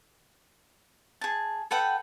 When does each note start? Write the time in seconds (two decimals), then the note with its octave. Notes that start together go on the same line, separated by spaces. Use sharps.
1.21 G#4 A5
1.71 A4 B4 F#5 G5